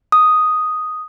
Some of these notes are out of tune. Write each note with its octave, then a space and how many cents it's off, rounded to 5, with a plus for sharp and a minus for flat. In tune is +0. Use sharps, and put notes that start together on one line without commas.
D#6 +0